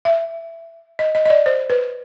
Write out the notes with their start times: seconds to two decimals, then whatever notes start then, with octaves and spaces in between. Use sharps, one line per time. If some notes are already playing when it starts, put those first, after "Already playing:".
0.05 E5
0.99 D#5
1.15 D#5
1.25 D#5
1.30 D5
1.46 C5
1.70 B4